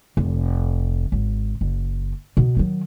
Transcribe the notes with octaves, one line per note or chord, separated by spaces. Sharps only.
F1
G#1
F#1
B2
D#3 F#3